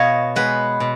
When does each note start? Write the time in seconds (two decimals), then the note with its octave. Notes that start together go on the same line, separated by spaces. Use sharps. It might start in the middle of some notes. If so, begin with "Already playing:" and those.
Already playing: B2 C#5 D#5 F5 G#5
0.36 G#3 B3 B4
0.80 B2